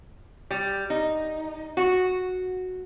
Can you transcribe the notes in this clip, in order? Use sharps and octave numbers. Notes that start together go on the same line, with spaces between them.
G3
D#4
F#4